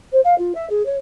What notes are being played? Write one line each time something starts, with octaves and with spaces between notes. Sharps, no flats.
C5
F5
F4
E5
G#4
C#5